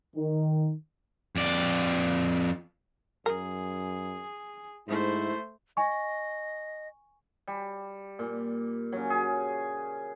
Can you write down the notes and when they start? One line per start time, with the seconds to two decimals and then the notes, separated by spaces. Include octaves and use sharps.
0.15 D#3
1.36 F2 D5
3.26 F#2 G#4 A#4
4.88 G#2 A3 E4 C5
5.77 D#5 G#5 C#6
7.48 G3
8.19 A#2
8.92 C#3 F#3
9.10 G#4